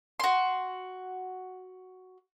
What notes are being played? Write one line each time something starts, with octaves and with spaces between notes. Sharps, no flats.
F#4 C6